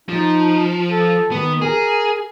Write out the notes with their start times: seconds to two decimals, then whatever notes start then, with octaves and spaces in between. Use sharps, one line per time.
0.09 F3 D#4
0.90 A4
1.31 D#3 B3
1.62 G#4 A#4